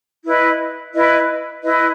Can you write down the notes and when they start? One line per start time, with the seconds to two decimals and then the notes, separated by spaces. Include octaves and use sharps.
0.24 E4 B4 D#5
0.94 E4 B4 D#5
1.62 E4 B4 D#5